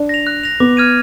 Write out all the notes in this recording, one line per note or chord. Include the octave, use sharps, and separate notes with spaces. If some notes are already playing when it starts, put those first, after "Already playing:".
Already playing: D4
A#6 F7
F#6
A#6 F7
B3 D6
F6 G#6 D#7